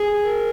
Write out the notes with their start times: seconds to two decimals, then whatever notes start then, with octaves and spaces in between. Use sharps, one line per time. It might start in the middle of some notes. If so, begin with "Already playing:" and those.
Already playing: G#4
0.22 A#4